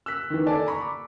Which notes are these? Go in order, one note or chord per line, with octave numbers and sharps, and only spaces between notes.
E6 F#6 B6
D#3 E3
A4 D5 G#5 A5
A#5 B5 C#6
D6